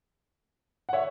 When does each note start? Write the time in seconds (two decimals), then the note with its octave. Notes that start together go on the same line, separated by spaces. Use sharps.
0.89 F#5
0.93 C#5 E5